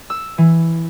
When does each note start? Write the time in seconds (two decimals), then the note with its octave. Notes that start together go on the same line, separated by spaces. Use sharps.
0.10 E6
0.38 E3